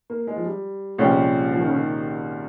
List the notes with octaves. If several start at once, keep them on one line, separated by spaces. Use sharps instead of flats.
A#3
G#3
F3
G3
C2 A#2 F3 G#3 C#4 G4
F3
D#3
C#3
D#3